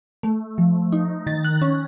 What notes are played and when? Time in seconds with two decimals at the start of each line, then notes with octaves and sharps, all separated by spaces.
0.23 A3
0.58 F3
0.92 D#4
1.27 D#3 A6
1.44 F#6
1.62 C#4